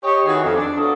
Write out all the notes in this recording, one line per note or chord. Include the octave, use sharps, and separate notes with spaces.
G4 C#5 D#5
D#3 E3 F#4 G#4
F2
D4
F3 F#3 B3 F#4 A4 D#5